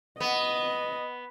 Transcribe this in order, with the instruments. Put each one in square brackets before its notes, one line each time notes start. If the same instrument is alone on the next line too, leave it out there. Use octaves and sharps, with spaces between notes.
[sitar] B3 [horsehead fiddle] D#5